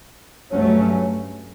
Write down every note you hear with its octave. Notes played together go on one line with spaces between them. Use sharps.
G2 F#3 A3 C#4